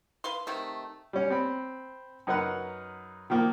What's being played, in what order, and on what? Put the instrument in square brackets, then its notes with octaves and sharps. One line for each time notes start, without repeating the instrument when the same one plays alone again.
[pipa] B4 F5 C6
C3 D#3 A3
[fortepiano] G3 C#4
C4 B5
F#2 D#4 A#4 B4 F#5
D#3 F3 A#3